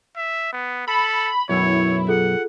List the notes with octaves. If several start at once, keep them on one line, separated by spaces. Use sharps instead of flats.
E5
B3
A4 B5
B1 F#2 E4 C#5
F4 G#4 A4 F#5